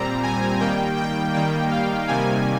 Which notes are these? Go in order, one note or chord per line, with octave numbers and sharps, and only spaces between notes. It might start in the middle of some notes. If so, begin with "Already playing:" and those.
Already playing: A#2 G3 C4 A#5
G#5
D#3 G3 A#3 G5
G5
D#3 G3 A#3 G5
F5
C3 D#3 G3 A#3 G#5